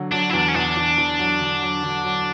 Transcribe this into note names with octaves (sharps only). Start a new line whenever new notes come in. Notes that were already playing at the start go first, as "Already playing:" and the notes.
Already playing: D3 F#3
F#3 D4
E4
E2 D4
C#4
E2 D4
E2
E2
F#3
D3
F#3
D3
F#3